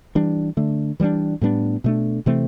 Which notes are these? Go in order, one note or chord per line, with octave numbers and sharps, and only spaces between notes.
E3 G3 D4
D3 A3 D4
E3 G3 B3 D4
A2 G3 B3 D4
B2 A3 D4
C3 E3 A3 C4